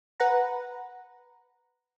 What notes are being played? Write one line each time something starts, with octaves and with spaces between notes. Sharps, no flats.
B4 F#5 A#5